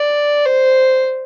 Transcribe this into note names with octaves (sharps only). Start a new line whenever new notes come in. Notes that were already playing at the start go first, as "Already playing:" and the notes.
Already playing: D5
C5